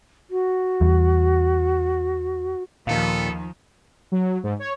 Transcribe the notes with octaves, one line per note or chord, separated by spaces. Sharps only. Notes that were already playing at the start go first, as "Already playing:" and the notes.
F#4
E2 G3
D#2 A#2 D#3 F3 B3 A4 F5
F#3
G#2
C#5